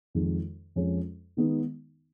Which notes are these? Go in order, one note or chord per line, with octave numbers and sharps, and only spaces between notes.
F2 D#3 G#3
F2 F3 G#3 C#4
D#3 G#3 B3 D#4